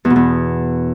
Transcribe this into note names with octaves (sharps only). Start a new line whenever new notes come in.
E2
B2
E2